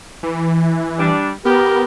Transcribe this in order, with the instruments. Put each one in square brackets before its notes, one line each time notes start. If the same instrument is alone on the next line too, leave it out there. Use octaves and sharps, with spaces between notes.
[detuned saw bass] E3
[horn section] G3 D4
[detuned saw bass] B3 [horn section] G4 A#4